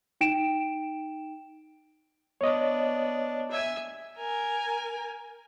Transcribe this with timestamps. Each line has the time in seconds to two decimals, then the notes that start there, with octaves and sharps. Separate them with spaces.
0.21 D#4 G5 D7 E7
2.41 B3 D4 C#5 D#5
3.51 E5 G#5
4.18 A#4 G#5